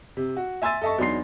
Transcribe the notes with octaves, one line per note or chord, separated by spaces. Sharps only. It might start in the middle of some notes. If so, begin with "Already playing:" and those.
C3
F#4
E5 G#5 C6 E6 A6 D#7
A4 D#5 E5 A5 C#6
E2 F#3 D4 D#4 C6 C7